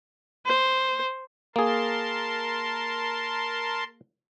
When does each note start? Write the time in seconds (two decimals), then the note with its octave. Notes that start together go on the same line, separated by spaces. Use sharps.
0.46 C5
1.56 A#3 G#4 A#4 A5 C6